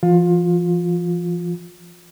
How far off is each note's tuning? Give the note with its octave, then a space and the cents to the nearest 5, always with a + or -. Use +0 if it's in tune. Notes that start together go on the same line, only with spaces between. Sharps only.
F3 -40 F4 +25